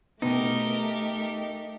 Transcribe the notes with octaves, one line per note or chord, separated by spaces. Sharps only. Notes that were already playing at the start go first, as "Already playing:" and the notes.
B2 A3 D#4 G4 A#4